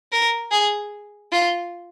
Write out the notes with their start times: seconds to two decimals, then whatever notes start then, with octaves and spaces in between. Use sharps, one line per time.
0.12 A#4
0.51 G#4
1.32 F4